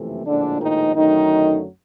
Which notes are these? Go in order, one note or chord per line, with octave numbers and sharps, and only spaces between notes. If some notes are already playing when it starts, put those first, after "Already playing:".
Already playing: F#1 F2 C3 E3 A3
A#1 A2 D3 F3 G#3 D4
D#3 D#4
F#2 D3 D#3 F#3 A3 D#4